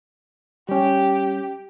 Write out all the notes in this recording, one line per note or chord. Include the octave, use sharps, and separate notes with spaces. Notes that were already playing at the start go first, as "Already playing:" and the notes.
G3 C#4 G4